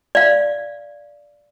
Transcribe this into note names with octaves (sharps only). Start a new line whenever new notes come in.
D5 F5